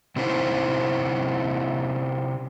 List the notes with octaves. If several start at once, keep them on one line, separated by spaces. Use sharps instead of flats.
C3 C4 C#4 D#4 E4 C5